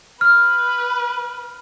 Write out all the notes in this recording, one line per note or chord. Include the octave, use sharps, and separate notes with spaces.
B4 F6